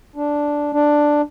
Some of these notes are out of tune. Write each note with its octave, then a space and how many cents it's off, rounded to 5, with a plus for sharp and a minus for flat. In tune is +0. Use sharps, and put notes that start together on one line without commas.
D4 -5
D4 +5